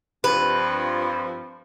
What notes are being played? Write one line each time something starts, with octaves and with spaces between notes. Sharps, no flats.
G2 F3 C4 B4